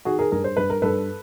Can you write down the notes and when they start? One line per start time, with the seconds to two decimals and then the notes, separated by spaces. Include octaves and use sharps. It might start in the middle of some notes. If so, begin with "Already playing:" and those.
0.05 D#3 F#4 G#4
0.19 G#4 A#4
0.32 G2 G#4 A#4
0.44 C5
0.57 G2 B4
0.70 A#4
0.82 G2 A4 B4